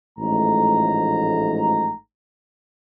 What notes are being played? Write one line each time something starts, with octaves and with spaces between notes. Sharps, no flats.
A1 G#2 F3 A3 A#5